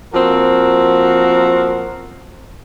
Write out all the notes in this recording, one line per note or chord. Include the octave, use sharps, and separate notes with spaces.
F3 A#3 C4 F#4 A#4